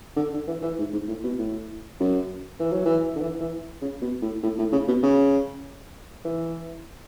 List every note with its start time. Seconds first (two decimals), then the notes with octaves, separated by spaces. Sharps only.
0.17 D3
0.33 D3
0.48 E3
0.63 E3
0.79 G#2
0.93 G#2
1.08 A2
1.24 B2
1.39 A2
2.00 F#2
2.60 E3
2.72 F#3
2.86 E3
3.16 D3
3.21 E3
3.41 E3
3.82 C#3
4.02 B2
4.22 A2
4.43 A2
4.59 A2
4.73 C#3
4.88 B2
5.03 C#3
6.25 E3